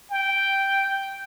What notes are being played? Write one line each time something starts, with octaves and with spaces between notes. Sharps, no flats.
G5